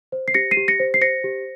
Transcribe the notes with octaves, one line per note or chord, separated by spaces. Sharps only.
C5
C7
G4 A#6 C#7
C7 D#7
G4
A#6 C#7
C5
C7
C5 A#6 C#7
G4